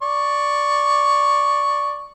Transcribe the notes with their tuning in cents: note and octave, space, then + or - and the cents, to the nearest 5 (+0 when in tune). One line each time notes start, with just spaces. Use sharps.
D5 +0 C#6 +0